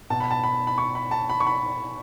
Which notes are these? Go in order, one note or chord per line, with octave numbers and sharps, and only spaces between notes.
B2 A5
B5
A5
B5
B5
C#6
B5
A5
B5
C#6
B5